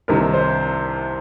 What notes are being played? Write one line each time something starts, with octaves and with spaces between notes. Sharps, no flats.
C2 C3 D#3 A#4
C5